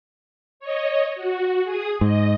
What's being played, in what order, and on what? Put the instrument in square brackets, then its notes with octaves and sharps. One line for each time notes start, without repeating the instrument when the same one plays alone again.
[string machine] C#5 D#5
F#4
G#4 D#6
[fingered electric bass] G#2 [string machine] D#5